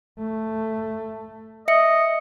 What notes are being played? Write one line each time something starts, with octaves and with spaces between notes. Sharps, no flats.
A3
D#5 E5 C#7